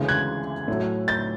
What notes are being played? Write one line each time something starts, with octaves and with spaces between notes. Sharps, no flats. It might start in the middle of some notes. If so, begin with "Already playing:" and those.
Already playing: D2 C#3 E3 G#3
F#6 G#6
A2 F#3 A3
G6 A6